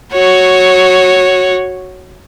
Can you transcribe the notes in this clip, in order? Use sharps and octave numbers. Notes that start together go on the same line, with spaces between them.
F#4 C#5